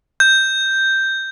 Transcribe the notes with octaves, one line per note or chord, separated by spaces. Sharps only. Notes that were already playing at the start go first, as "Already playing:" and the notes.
G6